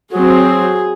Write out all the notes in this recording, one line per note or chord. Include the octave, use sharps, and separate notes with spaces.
F#3 C4 G#4